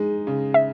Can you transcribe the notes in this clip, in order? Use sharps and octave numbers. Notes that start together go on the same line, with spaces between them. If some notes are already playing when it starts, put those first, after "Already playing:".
Already playing: G#3 D#4
C#3
E5